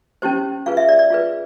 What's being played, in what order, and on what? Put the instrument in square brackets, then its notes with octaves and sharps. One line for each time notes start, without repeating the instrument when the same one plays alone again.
[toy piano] C#4 E4 G4 C5
F4 G#4 B4 F5
E5
D5
D5
F4 G#4 B4